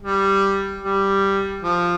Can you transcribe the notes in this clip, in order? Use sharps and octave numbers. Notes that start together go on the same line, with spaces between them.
G3
G3
F3